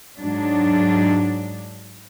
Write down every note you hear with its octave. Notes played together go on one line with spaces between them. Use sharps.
G#2 F#3 D4